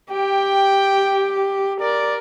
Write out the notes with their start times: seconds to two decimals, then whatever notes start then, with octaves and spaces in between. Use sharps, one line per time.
0.11 G4 G5
1.81 A#4 D5